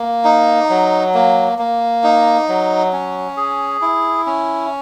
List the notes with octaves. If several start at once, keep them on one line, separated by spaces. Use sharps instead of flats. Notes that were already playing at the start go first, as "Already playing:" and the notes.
Already playing: A#3
D#4
F#3
A#3
A#3
D#4
F#3
C#4
G#4
E4
C#4